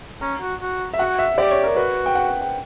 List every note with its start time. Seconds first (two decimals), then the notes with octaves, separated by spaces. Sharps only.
0.21 C#4 A#5
0.41 F#4
0.61 F#4
0.93 E5
0.99 F#4 F#5
1.19 E5
1.38 G4 D5
1.51 C#5
1.64 A#4
1.76 F#4 B4
2.06 G5
2.15 F#5
2.28 G5
2.41 G5